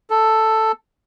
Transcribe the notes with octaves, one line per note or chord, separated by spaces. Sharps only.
A4